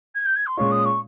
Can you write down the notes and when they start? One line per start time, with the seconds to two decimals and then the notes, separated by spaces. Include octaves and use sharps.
0.15 G#6
0.26 G6
0.36 G#6
0.47 C6
0.57 A#2 G#3 C#4 F4 C#6
0.71 D#6
0.85 C#6